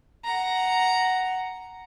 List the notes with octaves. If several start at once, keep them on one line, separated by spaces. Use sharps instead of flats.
F#5 A#5